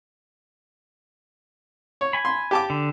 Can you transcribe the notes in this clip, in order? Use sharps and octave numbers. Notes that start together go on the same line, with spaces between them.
C#5
G#5 B5
C6
G4 A5 D6
D3